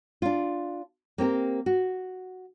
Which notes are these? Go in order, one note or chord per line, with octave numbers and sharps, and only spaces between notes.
D4 F4
A#3 C4 G4 A#4
F#4